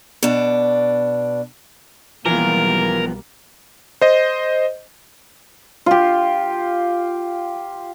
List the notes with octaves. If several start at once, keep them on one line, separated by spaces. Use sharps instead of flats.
B2 D4
B1 E3 F3 G3 A#3 B3 F4 A#4
C5 D#5
F4 G4